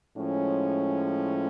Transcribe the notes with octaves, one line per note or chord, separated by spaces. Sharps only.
A2 F3 G#3 C#4